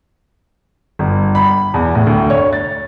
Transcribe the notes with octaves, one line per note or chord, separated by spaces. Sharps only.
G1
B5
E2
A2
D2
C#5
A6